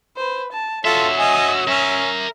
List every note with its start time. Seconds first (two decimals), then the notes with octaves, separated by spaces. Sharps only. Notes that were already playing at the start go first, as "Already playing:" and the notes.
0.16 B4 C5
0.52 A5
0.85 F4 F#4 A4 C#5 E5 E6
1.19 D#5 G#5
1.67 C#4 A#4 E5